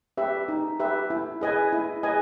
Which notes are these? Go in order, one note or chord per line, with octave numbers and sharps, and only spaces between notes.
G4 B4 E5
D#4
G4 B4 E5
E4
G#4 B4 D#5 G#5
E4
G#4 B4 D#5 G#5